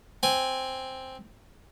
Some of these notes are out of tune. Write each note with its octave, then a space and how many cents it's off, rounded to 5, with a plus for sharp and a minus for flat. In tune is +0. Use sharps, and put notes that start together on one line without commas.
C4 +0 G#5 +0